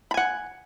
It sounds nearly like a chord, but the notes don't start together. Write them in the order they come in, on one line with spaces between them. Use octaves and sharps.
B5 G#5 F#5